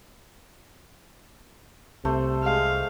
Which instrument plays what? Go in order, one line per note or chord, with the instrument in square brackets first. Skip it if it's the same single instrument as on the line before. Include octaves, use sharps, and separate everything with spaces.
[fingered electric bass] C2 [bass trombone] C3 [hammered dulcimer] A3 C5
[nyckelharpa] G#3 F5